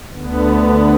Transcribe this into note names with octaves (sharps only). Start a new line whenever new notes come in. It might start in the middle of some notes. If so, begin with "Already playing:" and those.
D2 D3 B3